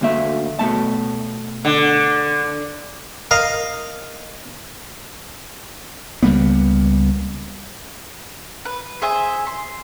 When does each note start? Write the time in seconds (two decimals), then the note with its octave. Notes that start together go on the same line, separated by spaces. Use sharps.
0.01 D2 A#3 E5
0.59 B2 A3 A5
1.65 D3
3.31 A#4 D#5 F5
6.23 C#2 G3 A#3 B3
8.65 B4
9.02 G#4 C5 E5 G#5
9.47 C6